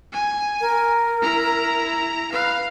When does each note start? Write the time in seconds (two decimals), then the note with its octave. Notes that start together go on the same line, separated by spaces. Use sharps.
0.12 G#5
0.61 A#4
1.22 E4 A#5
2.32 B4 F5